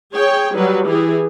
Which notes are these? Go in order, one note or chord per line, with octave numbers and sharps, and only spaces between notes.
G#4 C#5 G5
F#3 G3 B4
E3 G4 G#4